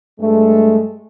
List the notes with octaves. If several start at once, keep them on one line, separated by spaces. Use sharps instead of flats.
G2 G#3 A3